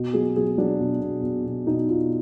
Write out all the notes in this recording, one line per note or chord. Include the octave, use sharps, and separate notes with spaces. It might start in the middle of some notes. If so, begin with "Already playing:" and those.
Already playing: B2
F#3 G#4
F#3 G#4
F#3 D4
B2
B2
B2
B2
B2 D#4
B2 F4